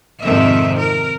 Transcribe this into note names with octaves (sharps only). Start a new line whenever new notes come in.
F2 G#2 C3 D#3 F3 E5
A#4